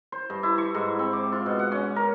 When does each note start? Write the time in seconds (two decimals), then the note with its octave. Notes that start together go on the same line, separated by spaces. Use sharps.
0.12 C5
0.30 G2
0.43 E4
0.58 C#6
0.74 G#2
0.99 C4
1.13 D6
1.32 F4
1.46 B2
1.59 F#5
1.72 C#4
1.96 A#4